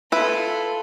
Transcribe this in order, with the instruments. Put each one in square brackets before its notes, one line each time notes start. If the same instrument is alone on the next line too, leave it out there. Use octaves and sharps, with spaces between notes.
[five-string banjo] E4 B4 [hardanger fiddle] F4 A4